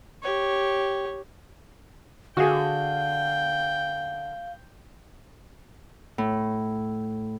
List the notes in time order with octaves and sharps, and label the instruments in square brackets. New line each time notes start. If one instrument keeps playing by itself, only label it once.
[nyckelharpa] G4 C#5
[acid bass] D3 [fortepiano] F#4 G#4 [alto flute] F5 [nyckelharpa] G5
[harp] A2